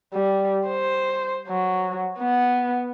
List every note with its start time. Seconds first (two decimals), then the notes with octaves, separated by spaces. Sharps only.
0.14 G3
0.67 C5
1.48 F#3
2.19 B3